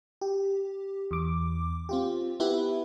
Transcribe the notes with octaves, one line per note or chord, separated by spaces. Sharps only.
G4
E2 D6
C4 F4 G4
B3 E4 G4 B4